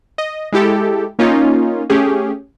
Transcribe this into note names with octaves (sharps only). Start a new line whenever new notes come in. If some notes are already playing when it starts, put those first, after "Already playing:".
D#5
G#3 E4 G4 A4
A#3 C#4 D#4 F4
A3 C#4 G4 G#4